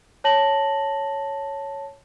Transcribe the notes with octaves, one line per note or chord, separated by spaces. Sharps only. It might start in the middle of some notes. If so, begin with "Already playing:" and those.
C#5 A5 A#6 F#7